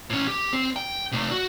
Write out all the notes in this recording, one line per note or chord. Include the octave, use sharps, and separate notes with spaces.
A2 C#4
G4
C4
G5
C3 A3
F#4